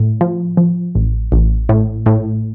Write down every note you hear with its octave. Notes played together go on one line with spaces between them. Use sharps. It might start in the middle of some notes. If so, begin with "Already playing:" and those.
Already playing: A2
F3
F3
A1
A1
A2
A2